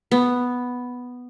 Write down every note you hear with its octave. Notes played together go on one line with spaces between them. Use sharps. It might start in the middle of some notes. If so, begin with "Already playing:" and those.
B3